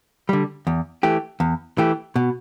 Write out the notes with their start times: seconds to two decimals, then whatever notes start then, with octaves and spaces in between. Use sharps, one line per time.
0.29 D3 G3
0.67 E2
1.03 E3 A3 G4
1.40 E2
1.78 E3 A3 G4
2.16 B2